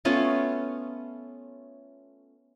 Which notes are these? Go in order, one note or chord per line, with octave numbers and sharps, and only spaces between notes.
A3 B3 C#4 F4